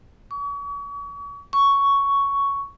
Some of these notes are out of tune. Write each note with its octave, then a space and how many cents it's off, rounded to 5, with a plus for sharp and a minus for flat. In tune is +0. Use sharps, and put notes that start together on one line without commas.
C#6 +40
C#6 +5